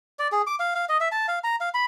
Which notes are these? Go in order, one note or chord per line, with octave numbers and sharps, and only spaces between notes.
D5
G#4
D6
F5
F5
D#5
E5
A5
F5
A#5
F5
B5